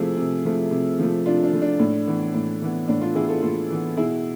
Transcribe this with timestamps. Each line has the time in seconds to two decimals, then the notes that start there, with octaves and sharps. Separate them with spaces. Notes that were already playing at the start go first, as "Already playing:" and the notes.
Already playing: C3 F3 A3 E4 G#4
0.17 C3
0.45 F3 A3
0.71 C3
0.99 F3 A3
1.26 C3 D4 F4
1.43 D4
1.53 F3 A3
1.62 D4
1.80 A2
2.07 E3 B3
2.34 A2
2.62 E3 B3
2.88 A2 D4
3.02 D4 F4
3.15 E3 B3 E4 G#4
3.29 F4 A4
3.42 A2 F4 A4
3.70 E3 B3
3.97 B2 E4 G#4